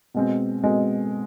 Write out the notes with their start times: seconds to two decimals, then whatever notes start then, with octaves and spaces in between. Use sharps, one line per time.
0.14 B2 G#3 C4
0.64 B2 G#3 C4